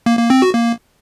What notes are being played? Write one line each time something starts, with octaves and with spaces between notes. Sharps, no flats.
A#3
A#3
C4
F#4
A#3